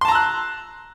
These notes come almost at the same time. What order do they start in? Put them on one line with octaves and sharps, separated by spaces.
C6 A5 A#5 E6 F#6